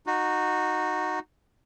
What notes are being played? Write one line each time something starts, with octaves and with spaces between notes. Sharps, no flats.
D#4 F#4